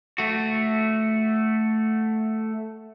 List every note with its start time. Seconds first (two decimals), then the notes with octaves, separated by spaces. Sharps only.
0.18 A3 F#4